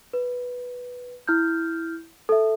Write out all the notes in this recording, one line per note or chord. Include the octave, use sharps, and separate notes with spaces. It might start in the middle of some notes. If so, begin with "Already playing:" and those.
B4
E4 F6 G6
A4 E5